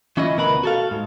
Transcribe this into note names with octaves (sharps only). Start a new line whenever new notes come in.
E3 C#4 E4 F4 D#5
D2 B2 A#4 B4 A5 B5
F#4 A4 F5
G#2